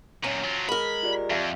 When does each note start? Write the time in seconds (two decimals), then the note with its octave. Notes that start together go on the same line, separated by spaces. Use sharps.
0.24 F#2 A#2 C#4
0.44 F#3 F4
0.69 G#3 A#4 B5
1.03 F4 G4 D5
1.30 F2 E5 F5